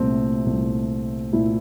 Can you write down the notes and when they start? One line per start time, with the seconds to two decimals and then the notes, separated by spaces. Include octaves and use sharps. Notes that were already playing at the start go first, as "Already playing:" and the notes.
Already playing: C2 A#2 A3 C4
0.46 C2 A#2 A3
1.33 A#2 A3 E4